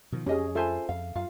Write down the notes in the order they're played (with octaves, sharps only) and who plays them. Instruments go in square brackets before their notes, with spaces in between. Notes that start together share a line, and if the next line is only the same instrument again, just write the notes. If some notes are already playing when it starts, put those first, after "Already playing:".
[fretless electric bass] B2 D#3 F3
[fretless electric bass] F2 [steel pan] C#4 G#4 [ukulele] G4 D#5
[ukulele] F4 C5 G#5 [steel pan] A4 E5
[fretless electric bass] F2 [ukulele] F5
[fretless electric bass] F#2 [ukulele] F4 F5